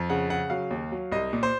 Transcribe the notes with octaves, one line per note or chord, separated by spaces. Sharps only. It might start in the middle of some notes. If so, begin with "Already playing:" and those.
Already playing: F2
C#3 F#5
C#3 F#5
F#3 F5
D#2
F#3
C2 D#5
A#2
C5